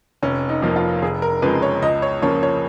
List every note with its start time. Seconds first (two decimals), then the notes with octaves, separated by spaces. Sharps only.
0.22 F1 C#4
0.49 D#4
0.62 F2 F3 A#3
0.76 F4
1.02 F1 G#4
1.22 A#4
1.42 F2 C#3 G#3 B4
1.62 C#5
1.82 C#2 D#5
2.02 C#5
2.22 C#3 F3 A#3 C#5
2.43 C#5